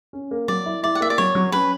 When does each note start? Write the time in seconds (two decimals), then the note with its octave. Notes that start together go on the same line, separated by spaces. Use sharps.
0.13 C#4
0.31 A#3
0.48 F#3 D5
0.66 E4
0.83 E4 D5
0.95 F#5
1.00 A#3 E5
1.10 D5
1.18 F#3 C#5
1.35 F#3
1.52 C#4 B4